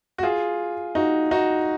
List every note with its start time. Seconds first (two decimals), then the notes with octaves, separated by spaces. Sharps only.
0.18 F#4
0.23 F4 G#4
0.95 D#4 F#4
1.31 D#4 F#4